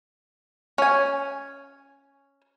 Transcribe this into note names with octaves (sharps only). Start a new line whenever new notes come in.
C#4 G#5